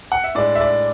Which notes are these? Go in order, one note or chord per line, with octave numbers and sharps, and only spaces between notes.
F#5
E5
A2 G#3 D4 D5
E5
D5